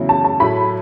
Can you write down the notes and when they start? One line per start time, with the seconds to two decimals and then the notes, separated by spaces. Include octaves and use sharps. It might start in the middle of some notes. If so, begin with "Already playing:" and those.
Already playing: E2 C#3 F#3 A3 E4
0.09 A5
0.24 A5
0.40 A2 F#3 A3 B5